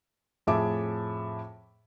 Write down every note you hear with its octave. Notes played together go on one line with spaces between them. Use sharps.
F2 A2 G#4 E5 A5 D6